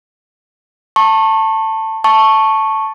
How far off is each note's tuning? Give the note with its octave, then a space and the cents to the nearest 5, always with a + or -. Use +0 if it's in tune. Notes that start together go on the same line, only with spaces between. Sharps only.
A5 +15 C#6 -25
A5 +0 C#6 -10